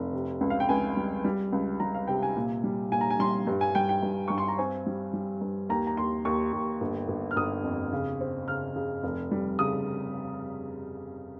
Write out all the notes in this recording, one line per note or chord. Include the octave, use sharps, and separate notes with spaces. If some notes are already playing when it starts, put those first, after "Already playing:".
Already playing: F1
C3
C#2
F5
G5
C#2 G#5
G3
G3
C#2
G3 A#5
F5
C3 G5
G#5
A#2
G3
A#2 G#5
A#5
G#5
G3 C6
G2
G#5
G2 G5
G5
G2
G2 C#6
C6
A#5
C4 G#5
G3
G3
G2
D#2 A#5
A#5
D#2 C6
D#2 C#6
D#2
G1
G1
F6
G1 D#6
F2
C#3
C4
C#3 F6
C#3
F1
G3
C#3 D#6